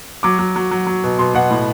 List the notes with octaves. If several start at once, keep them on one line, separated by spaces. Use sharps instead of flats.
F#3 D6
F#3
F#3
F#3
F#3
B2
B2 C6
B2 F#5
A2